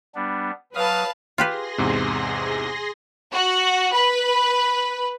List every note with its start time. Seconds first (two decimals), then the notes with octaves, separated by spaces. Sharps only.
0.15 G3 B3 D4
0.75 F#3 B4 F5 A5 D#6 F6
1.38 F4 G4 G#4 B4 C6 A#6
1.78 E2 G#2 C3
3.33 F#4
3.93 B4